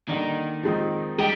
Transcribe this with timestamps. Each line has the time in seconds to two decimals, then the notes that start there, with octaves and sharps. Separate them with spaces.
0.08 D3 D#3 G3 A#3
0.63 F3 G#3 C4 D#4
1.18 G3 G#3 D#4 G4